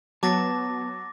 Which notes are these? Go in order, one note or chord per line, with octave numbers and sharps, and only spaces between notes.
F#3 B3 A5 D6 A6 A#6